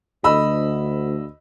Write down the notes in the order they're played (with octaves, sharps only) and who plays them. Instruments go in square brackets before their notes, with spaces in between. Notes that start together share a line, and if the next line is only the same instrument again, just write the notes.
[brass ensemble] D2 [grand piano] D#5 B5 E6